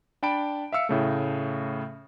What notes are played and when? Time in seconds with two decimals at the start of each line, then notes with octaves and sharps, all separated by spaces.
0.23 D4 G5 A5 B5 D7
0.72 E5 F5 E6 C#7
0.89 A2 C#3 A3